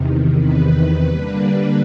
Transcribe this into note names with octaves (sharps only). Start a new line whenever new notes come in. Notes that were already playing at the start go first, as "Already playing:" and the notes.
Already playing: E2 C3 D#3
B4
D3 G3 A#3 D4 B4